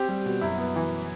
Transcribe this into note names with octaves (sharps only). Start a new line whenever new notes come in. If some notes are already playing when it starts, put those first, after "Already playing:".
Already playing: C4 G4
G3
B2
F#2 E4
B3
E3